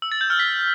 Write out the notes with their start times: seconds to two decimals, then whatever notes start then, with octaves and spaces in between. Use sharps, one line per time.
0.02 E6
0.12 A6
0.21 G6
0.30 F6
0.39 B6